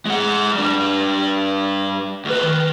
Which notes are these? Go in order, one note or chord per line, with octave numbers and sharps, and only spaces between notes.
G#3 F#5
G3 D4
D2 B4
D#3